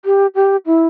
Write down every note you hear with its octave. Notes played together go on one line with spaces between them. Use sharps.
G4
G4
E4